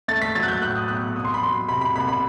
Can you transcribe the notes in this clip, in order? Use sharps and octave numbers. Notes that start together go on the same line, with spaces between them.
A3 A6
B6
F#3 A6
F#6
G6
A2 F#6
D#6
B1 F#6
C2 D#6
C6
B5
F#3 C6
C3 B5
B5
C2 B5
B5